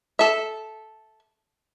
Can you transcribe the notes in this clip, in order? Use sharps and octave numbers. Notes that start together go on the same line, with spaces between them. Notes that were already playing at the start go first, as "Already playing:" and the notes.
A4 E5